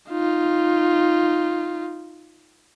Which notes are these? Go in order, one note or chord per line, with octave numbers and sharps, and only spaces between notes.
D#4 F4